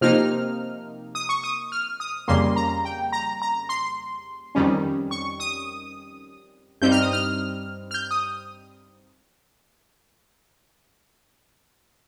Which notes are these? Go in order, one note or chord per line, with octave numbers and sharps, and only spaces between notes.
C3 F3 A#3 D#4 F6
D#6
C#6
D#6
F6
D#6
F2 C#3 G3 A#3 C6
A#5
G5
A#5
A#5
C6
F2 D#3 G3 C#4
C#6
D#6
G2 G3 C4 D#4 G6
F6
D#6
F6
F6
G6
D#6